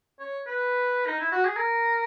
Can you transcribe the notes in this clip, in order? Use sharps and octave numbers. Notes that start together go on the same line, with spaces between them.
C#5
B4
D#4
E4
F#4
G#4
A#4